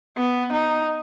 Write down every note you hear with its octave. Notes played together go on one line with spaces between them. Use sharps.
B3
D#4